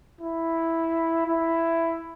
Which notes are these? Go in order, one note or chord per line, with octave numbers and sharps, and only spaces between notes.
E4
E4